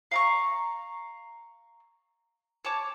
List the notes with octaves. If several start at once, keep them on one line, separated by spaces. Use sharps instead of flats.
F5 A#5 C#6
C#5 A5 D6